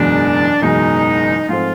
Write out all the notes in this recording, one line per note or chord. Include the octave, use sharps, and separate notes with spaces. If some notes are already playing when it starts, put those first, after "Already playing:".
Already playing: F#1 E2 B2 G#3 D4
F#1 E2 B2 G#3 D#4
G#2 F3 A3 C4 F4